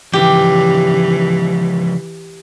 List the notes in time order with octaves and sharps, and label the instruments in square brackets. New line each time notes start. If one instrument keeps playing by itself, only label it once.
[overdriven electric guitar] C#3 F3 [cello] E3 [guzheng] G4